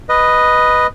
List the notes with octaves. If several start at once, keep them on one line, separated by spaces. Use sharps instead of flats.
B4 D#5